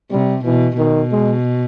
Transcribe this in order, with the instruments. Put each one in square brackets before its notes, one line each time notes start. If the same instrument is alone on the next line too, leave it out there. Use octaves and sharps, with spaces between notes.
[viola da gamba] C3 [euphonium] G3
[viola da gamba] B2 [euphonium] E3
[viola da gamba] B2 [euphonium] D#3
[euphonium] G#3